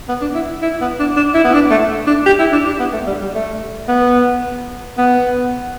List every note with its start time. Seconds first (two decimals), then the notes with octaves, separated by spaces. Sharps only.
0.09 B3
0.22 D4
0.35 E4
0.62 E4
0.81 B3
1.00 D4
1.17 D4
1.35 E4
1.45 B3
1.54 D4
1.71 A3
2.07 D4
2.26 G4
2.39 E4
2.53 D4
2.66 D4
2.80 B3
2.93 A3
3.07 G3
3.22 G3
3.35 A3
3.88 B3
4.98 B3